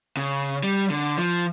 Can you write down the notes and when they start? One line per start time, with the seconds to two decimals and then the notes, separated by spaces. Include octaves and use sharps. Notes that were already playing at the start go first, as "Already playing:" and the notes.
0.17 C#3
0.63 G3
0.90 D3
1.18 F3